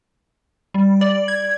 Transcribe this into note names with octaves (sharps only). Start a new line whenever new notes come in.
G3
D5
G#6